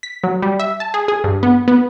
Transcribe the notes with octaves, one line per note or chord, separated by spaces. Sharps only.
B6
F#3
G3
E5
A5
G#4
G#4
G2
B3
B3